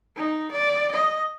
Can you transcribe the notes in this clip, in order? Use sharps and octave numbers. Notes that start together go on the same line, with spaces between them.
D#4
D5
D#5